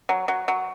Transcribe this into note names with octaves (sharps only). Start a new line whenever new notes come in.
F#3
F#3
F#3